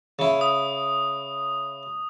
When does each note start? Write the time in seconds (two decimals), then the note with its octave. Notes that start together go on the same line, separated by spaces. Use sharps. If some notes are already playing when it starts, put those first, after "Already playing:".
0.19 C#3 E4
0.41 D#6